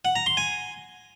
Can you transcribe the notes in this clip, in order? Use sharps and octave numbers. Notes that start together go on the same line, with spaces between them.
F#5
A#5
C6
G#5